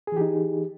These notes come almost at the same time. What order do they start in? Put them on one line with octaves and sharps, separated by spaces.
G#4 E3 G4 D#4